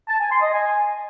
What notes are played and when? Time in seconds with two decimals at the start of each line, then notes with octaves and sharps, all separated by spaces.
0.08 A5
0.20 G#5
0.31 C6
0.42 D#5
0.53 G#5